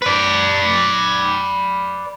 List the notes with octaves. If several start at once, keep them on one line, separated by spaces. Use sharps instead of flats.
B4 D5